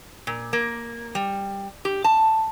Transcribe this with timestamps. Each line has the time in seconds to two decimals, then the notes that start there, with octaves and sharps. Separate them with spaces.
0.27 A#2
0.53 A#3
1.15 G3
1.85 G4
2.04 A5